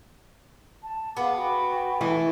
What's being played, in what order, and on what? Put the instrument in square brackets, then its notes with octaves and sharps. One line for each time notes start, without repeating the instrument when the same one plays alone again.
[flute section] A5
[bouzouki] B3 [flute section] G#4 F5 D6
[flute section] F#4 G5
[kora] E3 [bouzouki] A3